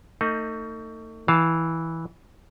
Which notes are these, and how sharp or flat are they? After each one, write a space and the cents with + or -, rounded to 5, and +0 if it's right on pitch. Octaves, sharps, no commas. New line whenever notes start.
A3 +35 D#4 +10
E3 -10 F5 +0 A5 +0